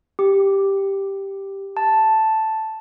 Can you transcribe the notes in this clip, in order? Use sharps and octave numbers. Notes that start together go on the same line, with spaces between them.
G4
A5